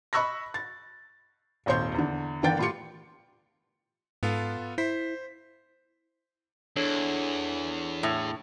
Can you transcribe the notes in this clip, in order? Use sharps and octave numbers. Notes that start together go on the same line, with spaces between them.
D#5 B5 C#6 E6 F#6 A#6
A6
D#1 G#1 C5 C#5 C6 G6
E2 D3
G1 D3 E3 A#4 G5 A6
A2 F4 G4 C6 C#7
G#2 B3 F4 A4
E4 C5 B6
E2 D4 A4 C#5
A2